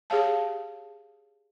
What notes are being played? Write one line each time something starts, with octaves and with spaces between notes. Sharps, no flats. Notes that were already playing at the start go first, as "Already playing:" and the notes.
G4 G#4 C#5 F5 A5